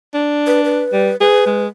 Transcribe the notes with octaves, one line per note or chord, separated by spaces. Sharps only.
D4
B4
B4
G3
G#4 B4
G#3